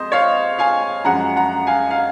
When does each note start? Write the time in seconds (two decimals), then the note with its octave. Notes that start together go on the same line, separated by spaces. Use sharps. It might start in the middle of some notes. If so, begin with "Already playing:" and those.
Already playing: F2 G#3 C5 D#5
0.12 C#5 F5
0.58 F5 G#5
1.05 F#2 F3 G#3 F#5 A#5
1.36 F#5 A#5
1.67 F5 G#5
1.90 F5